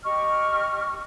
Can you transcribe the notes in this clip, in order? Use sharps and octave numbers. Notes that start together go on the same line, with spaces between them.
G4 D#5 C#6 F6